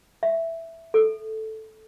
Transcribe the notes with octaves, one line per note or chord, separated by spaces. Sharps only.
E5
A4